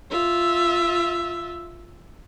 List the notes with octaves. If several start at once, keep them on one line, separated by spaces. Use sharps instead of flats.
F4 E5